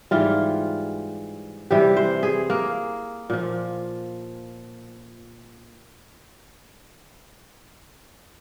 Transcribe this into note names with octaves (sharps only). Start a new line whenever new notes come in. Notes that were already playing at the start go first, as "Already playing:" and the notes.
G#2 E3 G3 F4
C3 E3 G3 G4
C5
G#4
A#3
A#2 F3